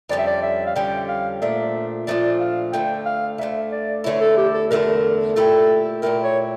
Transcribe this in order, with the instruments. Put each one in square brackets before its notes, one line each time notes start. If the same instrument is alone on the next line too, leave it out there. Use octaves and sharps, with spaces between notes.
[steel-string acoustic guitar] F2 D3 G3 C#4 [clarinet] D5
[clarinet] E5
D5
E5
F5
[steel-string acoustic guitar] F2 D3 G3 C#4 [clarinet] G5
[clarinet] F5
[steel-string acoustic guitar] A#2 F3 A3 D4 [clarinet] E5
[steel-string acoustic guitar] A#2 F3 A3 D4 [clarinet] D5
[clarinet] F5
[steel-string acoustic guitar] D2 D3 A3 [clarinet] G5
[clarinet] F5
[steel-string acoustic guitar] D2 D3 A3 [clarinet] E5
[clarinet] D5
[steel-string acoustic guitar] E2 D3 A3 E4 [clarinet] C#5
[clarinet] A4
G4
A4
[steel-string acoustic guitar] E2 D3 A3 E4 [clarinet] A#4
[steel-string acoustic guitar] A#2 A3 E4 G4 [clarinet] A4
[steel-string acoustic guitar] A#2 A3 E4 G4 [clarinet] A#4
[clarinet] C#5